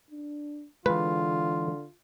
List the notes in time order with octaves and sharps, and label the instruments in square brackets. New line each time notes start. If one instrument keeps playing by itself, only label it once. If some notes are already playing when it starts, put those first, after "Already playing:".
[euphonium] D4
[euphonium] D3 [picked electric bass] E3 G#3 [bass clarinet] F4 [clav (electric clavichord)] B4